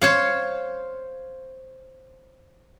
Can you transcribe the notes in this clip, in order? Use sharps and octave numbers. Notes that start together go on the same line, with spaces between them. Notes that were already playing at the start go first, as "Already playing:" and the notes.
C5 C#5 F5